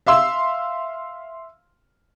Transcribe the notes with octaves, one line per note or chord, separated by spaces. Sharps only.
E5 F5 C6 E6